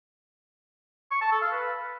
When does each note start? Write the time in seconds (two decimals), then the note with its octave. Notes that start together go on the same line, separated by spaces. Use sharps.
1.11 C#6
1.21 A5
1.31 A4
1.42 F5
1.52 B4